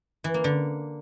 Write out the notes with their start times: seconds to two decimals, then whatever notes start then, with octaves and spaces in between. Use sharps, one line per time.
0.24 E3
0.34 A#3
0.44 D3